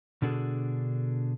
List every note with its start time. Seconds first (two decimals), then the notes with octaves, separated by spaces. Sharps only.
0.22 B2 D3 D4 F#4 G#4 A4